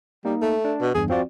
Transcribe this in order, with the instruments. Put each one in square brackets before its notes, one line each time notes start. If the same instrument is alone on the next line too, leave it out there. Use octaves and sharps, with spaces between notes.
[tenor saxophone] G3 [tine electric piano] A#3 D#4
[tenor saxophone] A3
[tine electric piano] D4
[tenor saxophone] B2
[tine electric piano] E2 G2 [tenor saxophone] G#4
[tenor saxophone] F3 [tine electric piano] C4 F#4 D5